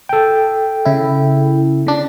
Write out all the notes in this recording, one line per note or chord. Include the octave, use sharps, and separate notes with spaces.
A4 G5
C#3 E4
C#3 D4